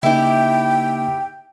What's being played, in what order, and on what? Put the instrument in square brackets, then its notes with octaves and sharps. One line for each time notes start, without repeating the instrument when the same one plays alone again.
[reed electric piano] C#3 A#3 D#4 [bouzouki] E4 G4 [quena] G5